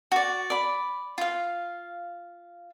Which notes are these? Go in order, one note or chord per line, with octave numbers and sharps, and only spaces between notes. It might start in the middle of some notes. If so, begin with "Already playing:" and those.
F#4 D5
D5 B5
F4 F5